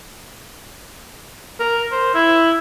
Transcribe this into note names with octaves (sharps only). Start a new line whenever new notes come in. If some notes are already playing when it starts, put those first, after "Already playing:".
A#4
C5
E4